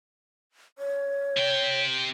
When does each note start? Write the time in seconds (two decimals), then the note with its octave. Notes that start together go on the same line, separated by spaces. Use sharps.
0.78 C#5
1.37 C3 G5